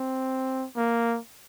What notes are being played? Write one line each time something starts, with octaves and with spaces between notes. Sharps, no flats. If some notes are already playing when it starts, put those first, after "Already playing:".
Already playing: C4
A#3